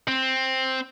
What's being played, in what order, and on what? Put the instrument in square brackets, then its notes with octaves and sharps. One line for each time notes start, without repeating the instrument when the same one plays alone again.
[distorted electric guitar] C4